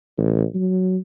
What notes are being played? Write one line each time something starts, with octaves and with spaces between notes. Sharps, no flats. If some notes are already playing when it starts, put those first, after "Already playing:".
A1
F#3